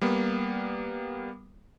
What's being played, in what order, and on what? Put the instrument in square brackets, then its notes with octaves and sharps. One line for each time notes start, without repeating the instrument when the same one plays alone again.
[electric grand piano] G3 A#3 B3